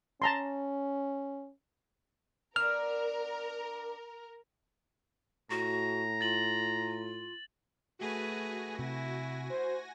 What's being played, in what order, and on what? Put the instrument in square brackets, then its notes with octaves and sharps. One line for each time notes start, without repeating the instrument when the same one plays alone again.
[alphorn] C#4 [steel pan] A5 A#5 C6
[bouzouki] B3 D4 [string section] A#4 [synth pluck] F6
[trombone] A2 [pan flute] F#4 [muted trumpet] A#5
[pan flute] F4 [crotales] A6 F#7
[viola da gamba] A3 G#4 B4 [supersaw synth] F#4 G#5 A#6
[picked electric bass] C3 [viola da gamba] E4
[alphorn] C5